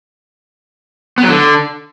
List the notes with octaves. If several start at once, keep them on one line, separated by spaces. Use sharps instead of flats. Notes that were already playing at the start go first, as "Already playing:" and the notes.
B3
F#3
D3